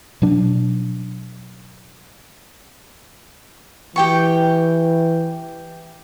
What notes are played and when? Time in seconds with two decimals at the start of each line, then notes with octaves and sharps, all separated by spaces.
0.22 B2 F#3 D4
3.96 E3 G4 G5 C#6